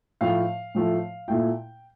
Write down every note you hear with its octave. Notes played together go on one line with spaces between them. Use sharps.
A2 F3 A3 F5
A2 F3 A3
A#2 A3 E4 G5